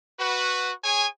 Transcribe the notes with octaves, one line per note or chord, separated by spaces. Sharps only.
F#4 B4
G#4 C#5 G#5